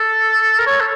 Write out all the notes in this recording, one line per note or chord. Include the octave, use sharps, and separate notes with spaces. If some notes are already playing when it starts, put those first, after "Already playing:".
Already playing: A4
A#4
C#5
A4